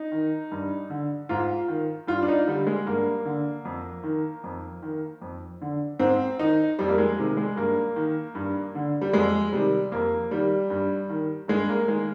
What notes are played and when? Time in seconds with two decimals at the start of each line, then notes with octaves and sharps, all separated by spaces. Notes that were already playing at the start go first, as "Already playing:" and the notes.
Already playing: D#4
0.12 D#3
0.52 G2
0.90 D3
1.29 G#2 F4
1.68 D#3
2.07 G2 F4
2.23 D4
2.28 D#4
2.47 D3 G3
2.67 G#3
2.87 G2 A#3
3.25 D3
3.65 F2
4.03 D#3
4.44 F2
4.82 D#3
5.22 F2
5.61 D3
5.99 G#2 C4
6.39 D#3 D#4
6.79 F2 G3
6.88 A#3
6.98 G#3
7.18 C3 D#3
7.37 G#3
7.56 G2 A#3
7.96 D#3
8.35 G2
8.75 D3
9.01 G3
9.13 F2 G#3
9.53 C3 D#3 G3
9.92 F2 A#3
10.31 D#3 G3
10.70 G2
11.10 D#3
11.48 G2 G#3
11.69 A#3
11.88 D#3 G#3